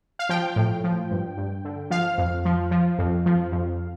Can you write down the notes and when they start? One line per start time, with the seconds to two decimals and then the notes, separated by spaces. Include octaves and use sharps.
0.19 F5
0.29 F3 G5
0.56 A2
0.84 F3
1.11 G2
1.37 G2
1.65 D3
1.90 F3 F5
2.18 F2
2.45 F3
2.71 F3
2.99 F2
3.26 F3
3.52 F2